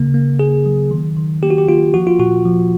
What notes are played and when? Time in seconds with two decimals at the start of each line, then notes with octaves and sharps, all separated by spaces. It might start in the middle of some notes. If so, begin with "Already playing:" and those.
Already playing: C#3 A#3
0.14 A#3
0.39 A#3 G#4
0.66 F#3
0.91 D#3
1.17 D#3
1.43 A#3 G4
1.50 F#4
1.58 G4
1.69 A#3 F4
1.94 F3 F#4
2.07 F4
2.19 A#2 F#4
2.46 F3